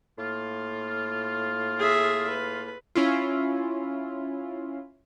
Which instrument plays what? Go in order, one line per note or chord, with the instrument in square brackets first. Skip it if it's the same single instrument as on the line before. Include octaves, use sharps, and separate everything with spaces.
[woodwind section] A2 A#3 F4
[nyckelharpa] G#4 E5
B4
[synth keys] C#4 E4 F4